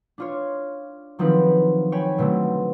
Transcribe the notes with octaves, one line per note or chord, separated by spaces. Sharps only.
D4 F4 C#5
D#3 F3 F#3 C4 D#4 B4
C#5 G5 G#5 B5
B2 D3 F#3 A3 C4